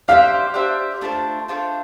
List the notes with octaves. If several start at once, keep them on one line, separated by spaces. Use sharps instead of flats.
D4 G4 C5 E5 F5
D4 G4 C5 E5
A3 D4 F4 C5
A3 D4 F4 C5